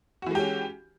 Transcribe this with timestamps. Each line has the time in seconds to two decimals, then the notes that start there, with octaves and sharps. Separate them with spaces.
0.22 F#4
0.27 E3
0.31 G#3
0.35 G4
0.39 C#4